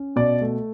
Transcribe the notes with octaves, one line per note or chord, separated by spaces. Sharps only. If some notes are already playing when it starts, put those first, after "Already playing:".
Already playing: C#4
B2 D5
A3